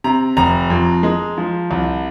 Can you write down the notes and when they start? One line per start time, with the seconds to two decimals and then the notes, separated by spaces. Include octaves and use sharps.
0.04 C3 A#5
0.37 F1 A#5
0.70 F2
1.03 G#3
1.38 F3
1.71 C2